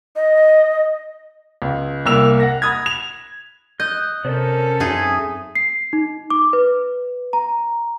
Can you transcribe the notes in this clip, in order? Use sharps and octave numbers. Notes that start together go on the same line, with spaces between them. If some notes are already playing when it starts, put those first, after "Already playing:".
D#5
C#2
C2 A#3 E6 F7
F#5 A#6
B5 D#6 G#6
F7
D#5 F#6 G6
C3 C#4 A4 A#4 C5 D5
F#2 C4 D#4 G#4 E5 G#5
C7
D#4
D6
B4
A#5